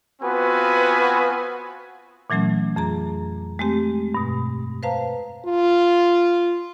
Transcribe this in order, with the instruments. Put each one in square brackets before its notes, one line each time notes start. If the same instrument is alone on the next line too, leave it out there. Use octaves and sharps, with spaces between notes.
[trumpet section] B3 C4 F4 F#4 B4 G#5
[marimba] A#2 E3 F#3 A3 C#4
F2 G#4 A#5
G#3 A3 C4 G4
G2 B2
B4 C5 F5 A5 A#5
[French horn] F4